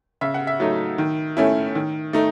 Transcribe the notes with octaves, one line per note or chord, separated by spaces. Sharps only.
C#3 E5
F#5
E5
F#3 A3 D#4
D#3
A3 C#4 E4
D#3
A3 D#4